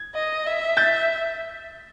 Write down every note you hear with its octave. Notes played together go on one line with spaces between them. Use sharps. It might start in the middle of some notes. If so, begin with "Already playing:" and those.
Already playing: G#6
D#5
E5
G6 A6